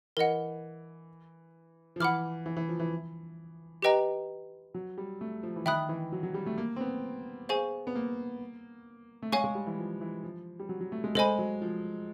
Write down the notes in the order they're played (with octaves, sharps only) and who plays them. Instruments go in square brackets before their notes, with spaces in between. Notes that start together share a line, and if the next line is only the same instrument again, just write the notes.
[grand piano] E3 [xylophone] A#4 D#5 F#5
[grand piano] F3
[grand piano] E3 [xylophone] F#5 B5 D6 F6
[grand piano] E3
E3
F3
E3
[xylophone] G4 B4 D#5 G5 A#5
[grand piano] F#3
G3
A3
F3
E3
[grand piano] D#3 [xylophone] E5 G5 B5 D#6 F#6
[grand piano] E3
F#3
F#3
G3
A3
A#3
C4
B3
[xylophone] G#4 C5 F5 G#5 C#6
[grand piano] B3
A#3
A3
[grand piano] G#3 [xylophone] C#5 F5 G#5 C#6
[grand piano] G#3
G3
E3
F3
E3
F3
G3
F#3
F#3
A3
G#3
[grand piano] G#3 [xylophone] A4 C5 D#5 G#5 B5
[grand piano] F#3
F3